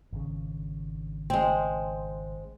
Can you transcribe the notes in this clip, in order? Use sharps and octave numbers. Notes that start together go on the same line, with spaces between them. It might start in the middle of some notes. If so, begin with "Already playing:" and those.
G#1 C#3
G#3 C4